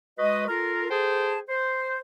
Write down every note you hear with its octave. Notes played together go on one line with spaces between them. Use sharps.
G#3 F#4 B4 D#5
F4 A4 A#4
G#4 A4 C5 G5 A5
C5